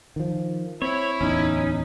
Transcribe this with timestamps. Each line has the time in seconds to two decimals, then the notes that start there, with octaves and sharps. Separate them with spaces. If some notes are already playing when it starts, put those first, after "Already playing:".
0.16 D#3 F3
0.82 C4 E4 C#5
1.21 D1 E2 C#4 D#4